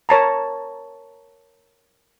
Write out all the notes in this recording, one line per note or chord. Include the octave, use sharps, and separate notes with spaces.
A#4 C#5 A5 A#5